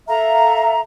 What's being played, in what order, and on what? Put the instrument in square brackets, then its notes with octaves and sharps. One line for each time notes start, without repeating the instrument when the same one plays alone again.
[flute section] A4 E5 F5 A#5